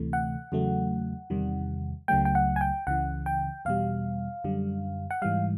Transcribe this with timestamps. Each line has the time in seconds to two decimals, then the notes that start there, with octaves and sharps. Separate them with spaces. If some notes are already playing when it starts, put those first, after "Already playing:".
Already playing: D2 C3 E3 A3
0.13 F#5
0.52 E2 C#3 F#3 A3
1.30 E2 C3 D#3 G3
2.08 C#2 C#3 F#3 A3 G5
2.25 G5
2.35 F#5
2.56 G#5
2.61 G5
2.87 C#2 C#3 E3 F#5
3.26 G5
3.65 E2 B2 G3 F5
4.44 F#2 D3 G3
5.11 F#5
5.22 G#2 E3 G3 F5